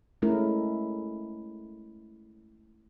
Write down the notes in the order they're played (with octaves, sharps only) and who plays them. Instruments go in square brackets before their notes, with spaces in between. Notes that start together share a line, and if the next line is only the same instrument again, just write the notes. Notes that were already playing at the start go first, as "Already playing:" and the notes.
[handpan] G#3 A3 C#4 E4 A#4